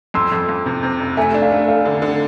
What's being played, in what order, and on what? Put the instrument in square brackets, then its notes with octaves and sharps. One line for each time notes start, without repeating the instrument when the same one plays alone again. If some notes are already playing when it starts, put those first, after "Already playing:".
[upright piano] F2 [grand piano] C6 E6
[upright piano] F2
F2
C3
C3
F1
[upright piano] A3 [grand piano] E5 G#5
[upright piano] D4
[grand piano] F5
[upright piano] A3
[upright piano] A3 [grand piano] F5
[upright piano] D3
D3